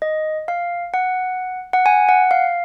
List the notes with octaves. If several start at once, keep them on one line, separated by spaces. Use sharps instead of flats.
D#5
F5
F#5
F#5
G#5
F#5
F5